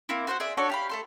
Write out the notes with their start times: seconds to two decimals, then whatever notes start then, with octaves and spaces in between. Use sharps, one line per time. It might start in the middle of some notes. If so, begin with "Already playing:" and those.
0.09 A#3 C4 E4
0.27 F#4 C5 F5 F#5
0.40 G#4 D5 E5
0.57 D4 F#4 A4 C#5
0.69 G4 F5 B5
0.89 A3 A4 C6